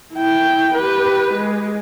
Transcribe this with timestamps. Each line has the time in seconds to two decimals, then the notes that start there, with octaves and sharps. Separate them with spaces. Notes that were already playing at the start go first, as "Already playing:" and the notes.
0.14 E4 G5
0.74 G4 B4
1.34 G#3